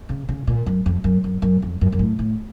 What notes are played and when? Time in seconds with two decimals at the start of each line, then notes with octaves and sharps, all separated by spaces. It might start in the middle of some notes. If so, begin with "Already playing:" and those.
0.09 C#3
0.29 C#3
0.47 A#2
0.66 F#2
0.86 F2
1.04 F#2
1.24 F#2
1.42 F#2
1.62 F2
1.81 F#2
1.92 F#2
1.99 A2
2.19 A2